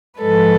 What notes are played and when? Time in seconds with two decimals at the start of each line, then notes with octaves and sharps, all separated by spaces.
0.20 G#2 F3 G#3 A4 B4